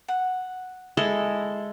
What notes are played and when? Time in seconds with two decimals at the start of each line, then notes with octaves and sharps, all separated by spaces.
0.08 F#5
0.97 G#3 E4 A4